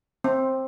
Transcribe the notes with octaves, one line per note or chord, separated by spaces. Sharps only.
C4